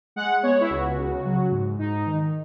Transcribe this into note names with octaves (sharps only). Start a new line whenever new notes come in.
G#3 F#5
B3 C#5
E4
C#2 F#4
C#3
F#3
G#2
G#2 D#4
D#3